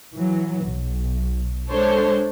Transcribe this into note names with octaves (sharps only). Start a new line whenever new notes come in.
E3 F#3
B1
G#3 D4 A4 C5 C#5